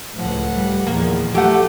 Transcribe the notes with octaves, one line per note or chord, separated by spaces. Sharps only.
C#2 A2 F3 F#5
G3
E2 A#2 D#3 F3 A#3
F#3 A3 G4 F#5